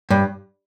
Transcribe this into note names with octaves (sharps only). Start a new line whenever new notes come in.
G2